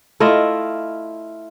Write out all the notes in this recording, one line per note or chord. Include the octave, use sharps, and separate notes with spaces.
A3 E4 F4 D#5